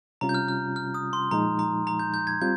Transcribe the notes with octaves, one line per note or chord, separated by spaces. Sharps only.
C3 G3 C#4 F4 A#5
G6
F6
F6
F6
D#6
C6
A#2 F3 G#3 D#4 A#5
A#5
A#5
G6
G6
G#6
G3 C4 F4 G6